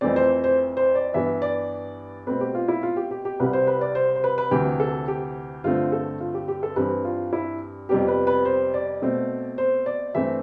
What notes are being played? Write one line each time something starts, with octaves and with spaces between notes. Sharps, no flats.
F2 E3 A3 C4 D5
C5
C5
C5
D5
G2 E3 B3 E5
D5
B2 A3 C4 B4
G4
F4
E4
F4
G4
G4
G4
C2 C3 G3 B4
C5
B4
D5
C5
C5
B4
B4
D2 C3 E3 G4
A4
G4
G2 D3 A3 C4 F4
A4
F4
G4
G4
A4
G2 E3 G3 C4 B4
F4
E4
F2 C3 G3 B3 G4
B4
B4
C5
D5
B2 A3 C4
C5
D5
G2 E3 A3 C4 E5